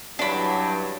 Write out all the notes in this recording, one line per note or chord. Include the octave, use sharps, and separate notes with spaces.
G2 E3 F#3 D4 B5